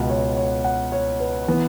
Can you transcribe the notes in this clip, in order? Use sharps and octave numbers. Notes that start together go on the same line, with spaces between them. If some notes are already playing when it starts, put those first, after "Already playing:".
Already playing: C#2 B2 B3 F#5
C#5
C#5
F#5
C#5
B4
E3 B3